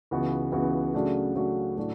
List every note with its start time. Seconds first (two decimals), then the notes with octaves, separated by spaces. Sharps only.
0.11 C#2 C#3 E3 B3 F#4
0.52 C#2 C#3 E3 B3 F#4
0.94 C#3 F#3 A3 D4 F#4
1.35 C#3 F#3 A3 D4 F#4
1.77 A2 F#3 A3 D4 F#4